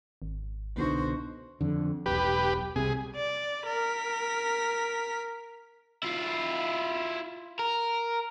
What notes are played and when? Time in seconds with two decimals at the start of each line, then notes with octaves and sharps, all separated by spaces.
0.22 G#1
0.76 C2 B2 D3 D#4 F#4 C5
1.61 F2 D3
2.06 E1 B1 G4 B4
2.76 C2 C3 G#4
3.16 D5
3.66 A#4 B6
6.03 E4 F4
7.59 A#4